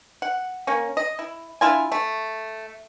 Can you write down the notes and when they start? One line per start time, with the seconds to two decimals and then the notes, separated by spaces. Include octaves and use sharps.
0.22 F#5
0.67 A#3 C#4
0.97 D#5
1.19 E4
1.61 D4 E4 F4 G#5
1.92 A3